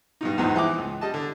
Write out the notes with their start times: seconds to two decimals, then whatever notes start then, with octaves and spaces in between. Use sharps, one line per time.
0.21 G2 B2 D#4
0.38 A#1 E2 G#2 B3 D#4
0.56 E3 D#4 D6
0.78 C#2
1.01 G3 D#5 A5
1.14 D3